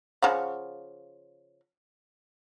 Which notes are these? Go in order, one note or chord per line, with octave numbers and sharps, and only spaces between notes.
C#3 F3 F#5